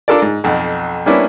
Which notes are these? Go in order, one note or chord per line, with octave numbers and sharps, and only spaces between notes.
D4 F4 A4 A#4 D5
G#2
B1 F2
G3 A#3 B3 C#4 D4 E4